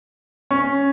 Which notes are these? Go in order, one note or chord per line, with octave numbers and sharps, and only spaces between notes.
C#4